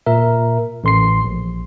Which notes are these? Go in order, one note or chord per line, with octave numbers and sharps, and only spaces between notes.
A#2 A#4 E5
A1 C6 C7
A#1